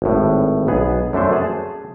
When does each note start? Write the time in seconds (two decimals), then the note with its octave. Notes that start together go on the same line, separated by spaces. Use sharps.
0.02 G#1 A2
0.67 B1 B3 G#4
1.13 F#2 A3 D4 C5
1.33 G#4 A5